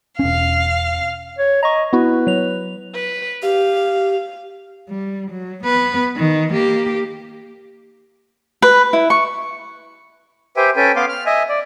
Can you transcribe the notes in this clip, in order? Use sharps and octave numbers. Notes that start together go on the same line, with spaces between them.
E1 C#4 F5
C#5
D#5 A#5 C#6
B3 E4 F#4 B4
F#3 F7
B4
G4 F5
G3
F#3
B3 B4
D#3
A#3 G4
B4
E4
C#6
G4 B4 C5 E5 G5 G#5
C#4 A4 B4 G5 G#5
B3 F5 C6 D6
F6
D#5 E5 G#5
D5